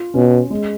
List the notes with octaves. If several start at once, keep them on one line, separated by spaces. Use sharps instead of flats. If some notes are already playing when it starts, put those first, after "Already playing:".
Already playing: F4
B2 C#4
G#3